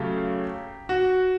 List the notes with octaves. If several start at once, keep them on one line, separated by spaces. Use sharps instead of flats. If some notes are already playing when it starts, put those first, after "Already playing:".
Already playing: C#3 F#3 A3 G4
F#4